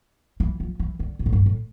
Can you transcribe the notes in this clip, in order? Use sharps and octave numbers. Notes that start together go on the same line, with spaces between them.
E3
F3
E3
D3
B2
A2
G2
A2